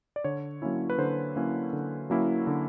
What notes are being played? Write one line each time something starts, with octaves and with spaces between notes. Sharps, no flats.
D5
D3 C#5
F#3 A#3 C#4 E4
B4
D3 C5
F#3 A#3 C#4 E4
D3
F#3 A#3 C#4 E4
D3